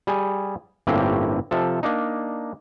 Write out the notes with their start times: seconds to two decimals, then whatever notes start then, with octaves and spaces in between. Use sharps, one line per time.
0.07 G3 G#4 G#5
0.87 G1 A2 A#3 C4 C#4 G4
1.51 C3 F3 A4
1.83 A#3 D4 D#4